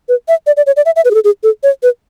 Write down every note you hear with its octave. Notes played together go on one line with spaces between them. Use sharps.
B4
E5
D5
D5
C#5
D5
E5
E5
B4
G#4
A4
G#4
A4
C#5
B4